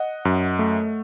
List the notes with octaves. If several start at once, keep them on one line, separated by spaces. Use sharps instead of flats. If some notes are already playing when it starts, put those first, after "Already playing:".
Already playing: D#5 F#5
F#2
A3